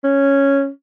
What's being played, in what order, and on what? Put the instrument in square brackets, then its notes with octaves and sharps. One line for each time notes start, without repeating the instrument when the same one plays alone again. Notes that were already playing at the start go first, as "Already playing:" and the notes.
[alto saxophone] C#4